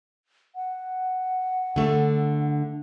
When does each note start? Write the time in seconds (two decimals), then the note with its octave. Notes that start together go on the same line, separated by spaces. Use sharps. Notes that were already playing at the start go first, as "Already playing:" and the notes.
0.55 F#5
1.76 D3 A3